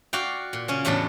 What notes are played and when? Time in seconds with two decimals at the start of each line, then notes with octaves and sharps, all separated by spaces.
0.13 F#4 D5 F5 G5
0.53 A#2
0.68 C#3 C#4
0.85 E2 A2 F#3 D4 A4